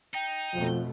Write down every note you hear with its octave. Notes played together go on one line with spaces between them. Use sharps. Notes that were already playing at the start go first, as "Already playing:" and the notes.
D#4 G5
F2 B2 F3 A3